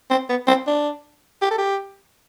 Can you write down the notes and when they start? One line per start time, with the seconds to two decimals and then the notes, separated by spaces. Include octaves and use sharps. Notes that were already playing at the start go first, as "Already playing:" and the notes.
0.10 C4
0.29 B3
0.47 C4
0.67 D4
1.42 G4
1.50 A4
1.58 G4